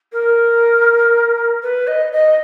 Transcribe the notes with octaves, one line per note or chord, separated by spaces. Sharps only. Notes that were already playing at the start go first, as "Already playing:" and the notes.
A#4
B4
D#5
D#5